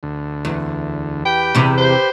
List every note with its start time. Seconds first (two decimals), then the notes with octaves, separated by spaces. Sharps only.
0.03 D2
0.45 E2
1.25 G4 B4 G5
1.55 E2 C3
1.78 C5